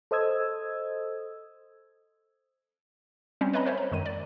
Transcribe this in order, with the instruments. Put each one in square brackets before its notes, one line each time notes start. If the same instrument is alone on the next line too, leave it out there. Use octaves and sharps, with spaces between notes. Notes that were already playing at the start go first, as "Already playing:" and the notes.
[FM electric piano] A4 C5 D#5 D#6 E6 G#6
[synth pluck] G3 C4 C#4
B4 C#5 D#5 A#5 B5
A#4 C5 C#5 E5
A#5
F#2 D#3 G#3 D#7
D5